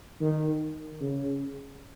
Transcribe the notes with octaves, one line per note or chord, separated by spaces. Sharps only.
D#3
C#3